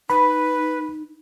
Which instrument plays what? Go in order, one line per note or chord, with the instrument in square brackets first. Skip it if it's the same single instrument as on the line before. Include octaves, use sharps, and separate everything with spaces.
[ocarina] D#4 [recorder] B4 [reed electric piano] B5